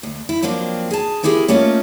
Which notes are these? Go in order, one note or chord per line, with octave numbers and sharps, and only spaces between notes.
D2
E4
F3 F#3 A#3 C4 D4
G#4 A5
F3 C4 E4 G4 G#4 A#4
A3 A#3 C#4 D#4 F4 A#4